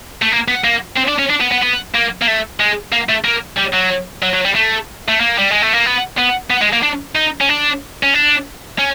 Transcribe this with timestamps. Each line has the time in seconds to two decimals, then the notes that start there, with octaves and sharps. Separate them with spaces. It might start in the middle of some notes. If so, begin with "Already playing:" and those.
0.22 A3
0.32 A#3
0.48 B3
0.64 A#3
0.97 C4
1.08 D4
1.19 C#4
1.30 D4
1.41 B3
1.51 B3
1.62 B3
1.94 A#3
2.22 A#3
2.27 A3
2.60 G#3
2.92 A#3
3.09 A3
3.25 A#3
3.58 G3
3.74 F#3
4.23 F#3
4.34 F#3
4.45 G3
4.55 A3
5.09 A3
5.20 A#3
5.38 G3
5.51 G#3
5.62 A3
5.73 A#3
5.86 B3
6.18 B3
6.50 B3
6.61 G#3
6.73 A#3
6.83 D4
7.16 D#4
7.41 C#4
7.49 D4
8.03 C#4
8.14 D4
8.79 C#4